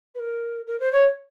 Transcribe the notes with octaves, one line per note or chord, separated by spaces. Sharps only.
B4
A#4
A#4
C5
C#5